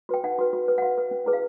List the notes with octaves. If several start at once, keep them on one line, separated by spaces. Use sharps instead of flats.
F#4 B4 G5
D#4 F#5
F#4 B4
F#4
B4
F#5
F#4 F5
B4
C#4
E4 G#4 B4
F5